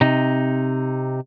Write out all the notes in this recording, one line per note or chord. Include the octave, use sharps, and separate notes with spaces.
C3 D#4